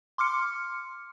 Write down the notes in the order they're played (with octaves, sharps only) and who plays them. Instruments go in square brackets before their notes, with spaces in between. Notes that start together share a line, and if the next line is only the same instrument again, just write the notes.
[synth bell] C6 D6 F6 C#7